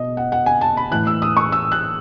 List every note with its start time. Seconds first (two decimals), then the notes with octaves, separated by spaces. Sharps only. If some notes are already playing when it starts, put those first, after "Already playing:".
Already playing: B2 D#5
0.17 F#5
0.32 F#5
0.46 G#5
0.61 A5
0.77 B5
0.91 A2 E3 F#6
1.07 E6
1.22 D#6
1.37 C#6
1.52 E6
1.72 F#6